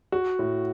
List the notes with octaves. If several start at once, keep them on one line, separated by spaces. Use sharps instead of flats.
F#4
A2